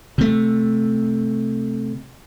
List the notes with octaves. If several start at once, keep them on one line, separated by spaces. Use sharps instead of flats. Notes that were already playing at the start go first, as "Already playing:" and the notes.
C3 A3